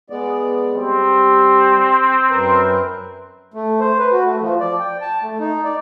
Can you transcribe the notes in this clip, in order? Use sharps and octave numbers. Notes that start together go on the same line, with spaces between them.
G#3 B3 D5
G3 C4
F#2 A#4 B4
A3
C5
B4
F#4
A3
F3
D5
G5
A5
A3
D#4
D5